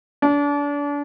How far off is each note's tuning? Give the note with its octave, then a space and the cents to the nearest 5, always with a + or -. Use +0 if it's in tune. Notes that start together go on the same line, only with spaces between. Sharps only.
D4 -35